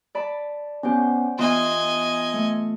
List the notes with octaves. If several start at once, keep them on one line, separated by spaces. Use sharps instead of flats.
D5 A5 B5
B3 C#4 G4 C5
E3 B3 F4 D#5 G#5 C6
A3